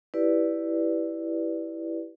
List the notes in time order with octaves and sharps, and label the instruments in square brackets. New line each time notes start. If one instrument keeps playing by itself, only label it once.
[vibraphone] E4 G4 B4 D5